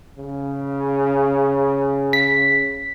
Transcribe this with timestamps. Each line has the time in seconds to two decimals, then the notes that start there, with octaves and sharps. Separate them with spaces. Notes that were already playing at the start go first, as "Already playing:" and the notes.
0.18 C#3
2.13 B6